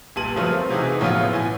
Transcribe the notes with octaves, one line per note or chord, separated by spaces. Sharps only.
G1 A#2 G3 A5 D#7 F#7
C#3 F3 F#3 A3 F4 A#4
C4
C3 E3 D#4 F#4 G#4
A2 C#3 F3 F#3 B3 F4
A2 E3 G#5